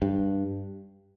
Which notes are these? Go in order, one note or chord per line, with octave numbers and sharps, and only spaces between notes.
G2